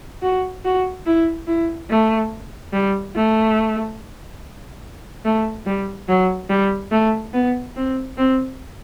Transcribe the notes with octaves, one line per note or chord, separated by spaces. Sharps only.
F#4
F#4
E4
E4
A3
G3
A3
A3
G3
F#3
G3
A3
B3
C4
C4